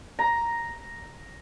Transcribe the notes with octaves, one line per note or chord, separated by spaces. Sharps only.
A#5